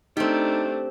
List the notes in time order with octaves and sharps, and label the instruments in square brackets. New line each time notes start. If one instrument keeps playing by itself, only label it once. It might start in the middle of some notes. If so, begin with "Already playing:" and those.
[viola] A3 D4 [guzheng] C4 G4 [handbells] D#4